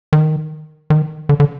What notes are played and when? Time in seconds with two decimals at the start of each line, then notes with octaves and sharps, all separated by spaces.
0.13 D#3
0.90 D#3
1.29 D3
1.40 D3